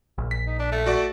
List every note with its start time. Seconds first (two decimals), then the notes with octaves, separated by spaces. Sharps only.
0.18 A#1
0.31 B6
0.47 D#4
0.59 D4
0.72 A3
0.86 F#4 D5 C#6